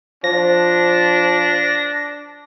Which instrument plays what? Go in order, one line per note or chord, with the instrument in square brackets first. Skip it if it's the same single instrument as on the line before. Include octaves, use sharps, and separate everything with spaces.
[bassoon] F3 [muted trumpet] D4 [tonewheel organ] A#6